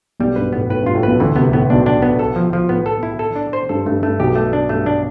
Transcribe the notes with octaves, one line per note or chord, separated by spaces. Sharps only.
B1 B2 G3
G2 B4
A2 B3
A2 B4
G2 F4
A2
B1 B2 B4
D2 D3 E3
C2 C3 B3
A2 B3
B1 B2 D4
D4
B3
A4
F3
F3
A2 B3
A4
E4
A4
D4
C5
G2 A4
G2 A3
G2 A3
B1 B2 G4
A3
D4
G2 A3
D4